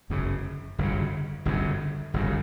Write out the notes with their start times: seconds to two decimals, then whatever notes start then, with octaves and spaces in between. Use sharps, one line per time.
0.10 G1 F#2 C#3
0.78 G1 F#2 C#3
1.45 G1 F#2 C#3
2.14 G1 F#2 C#3